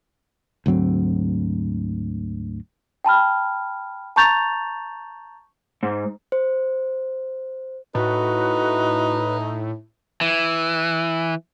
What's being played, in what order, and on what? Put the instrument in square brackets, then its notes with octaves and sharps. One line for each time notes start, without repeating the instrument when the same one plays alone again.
[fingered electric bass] D2 G#2 F#3 C4
[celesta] G5 A5 B5 F6
A5 A#5 C#6 G6 A6 F7
[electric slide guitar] G#2
[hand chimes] C5
[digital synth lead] A2 [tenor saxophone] D#4 [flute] F#4 [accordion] B4
[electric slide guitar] E3